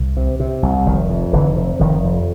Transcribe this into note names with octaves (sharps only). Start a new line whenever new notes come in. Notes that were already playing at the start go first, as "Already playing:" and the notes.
Already playing: C2
C3
C3
C2
F1 D#3
F2
F1 D3 E3
C3
F1 D#3 F3
F2